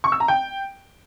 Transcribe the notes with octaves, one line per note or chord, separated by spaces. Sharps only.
C#6
E6
A#5
G5